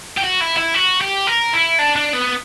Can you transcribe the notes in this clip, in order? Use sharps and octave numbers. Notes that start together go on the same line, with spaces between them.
G4
F#4
E4
E4
F#4
G4
A#4
E4
D4
D4
B3